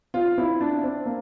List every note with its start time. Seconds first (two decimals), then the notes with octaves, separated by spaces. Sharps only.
0.14 F4
0.38 E4
0.61 D4
0.83 C4
1.06 A#3